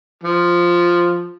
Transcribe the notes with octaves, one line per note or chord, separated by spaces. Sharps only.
F3